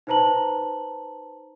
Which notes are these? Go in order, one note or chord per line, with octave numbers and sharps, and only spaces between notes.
D#4 B4 C5 A5 A#5 F#7